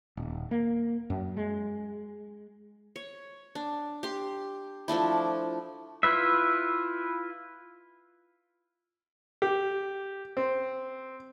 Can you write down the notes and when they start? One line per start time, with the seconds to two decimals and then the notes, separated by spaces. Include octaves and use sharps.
0.17 D#1
0.51 A#3
1.10 F#2
1.37 G#3
2.96 C#5
3.55 D4
4.03 G4 C6
4.88 F3 A3 D4 E4
6.03 E4 F4 B4 E5
9.42 G4
10.37 C4